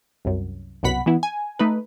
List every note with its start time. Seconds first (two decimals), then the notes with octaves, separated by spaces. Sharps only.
0.25 C2 F#2
0.83 C2 F#2 B2 F#5 B5 B6
1.06 E3 B3 E4
1.23 G#5
1.59 A3 D#4 B4